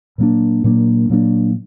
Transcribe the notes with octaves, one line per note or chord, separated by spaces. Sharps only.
A#2 F#3 A#3 D4
A#2 F#3 A#3 D4
A#2 F#3 A#3 D4